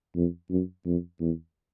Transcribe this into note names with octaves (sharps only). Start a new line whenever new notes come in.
F2
F#2
F2
E2